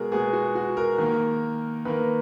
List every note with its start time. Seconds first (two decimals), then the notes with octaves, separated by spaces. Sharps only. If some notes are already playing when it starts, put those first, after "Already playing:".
Already playing: B2 G#3 G#4 A#4
0.12 B2 G#3 G#4
0.33 F#4
0.55 F#4
0.77 A#4
0.98 D#3 A#3
1.85 D#3 A#3 B4